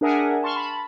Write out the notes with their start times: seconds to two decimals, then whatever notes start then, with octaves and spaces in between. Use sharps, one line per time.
0.01 D4 G#4 A#4 E5 F#5 G#5
0.43 A5 C6 C#6 F6
0.56 A5 B5